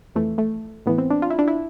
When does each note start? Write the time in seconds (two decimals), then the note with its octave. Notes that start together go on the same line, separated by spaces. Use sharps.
0.15 F2 E3 A3
0.38 A3
0.86 A2 E3 B3
0.98 C4
1.11 D4
1.22 F4
1.30 E4
1.39 D4
1.47 E4